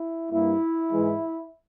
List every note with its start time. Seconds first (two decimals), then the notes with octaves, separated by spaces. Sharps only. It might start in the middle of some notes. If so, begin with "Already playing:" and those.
Already playing: E4
0.31 G2 G3 A#3 E4
0.93 G#2 E3 G#3